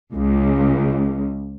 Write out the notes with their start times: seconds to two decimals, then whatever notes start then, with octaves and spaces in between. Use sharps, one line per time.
0.13 C#2